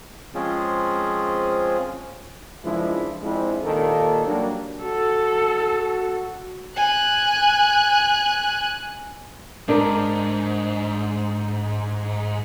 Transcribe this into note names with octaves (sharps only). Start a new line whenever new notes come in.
F3 G#3 C4 C#4 F4 G#4
C#2 F#2 F3 G#3 D4 E4
F3 G#3 C4 D4 E4
D#2 A#2 D#3 A#3 A4
F#3 G3 A#3 D4
F#4 A4
G#5 F#6
G#2 D4 A#4